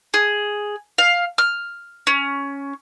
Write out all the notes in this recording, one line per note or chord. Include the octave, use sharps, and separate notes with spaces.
G#4
F5
F6
C#4